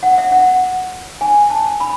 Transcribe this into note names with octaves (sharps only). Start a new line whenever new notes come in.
F#5
E5
F#5
G#5
A5
B5